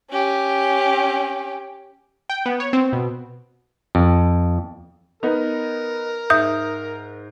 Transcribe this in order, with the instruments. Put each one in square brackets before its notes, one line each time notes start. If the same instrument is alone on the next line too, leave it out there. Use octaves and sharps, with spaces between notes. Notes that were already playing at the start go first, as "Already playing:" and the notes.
[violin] C#4 G4
[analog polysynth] G5
B3
C#5
C4
B2
[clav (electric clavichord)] F2
[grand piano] B3 D#4 [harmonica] A#4
[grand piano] G#2 [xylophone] E5 D#6 G6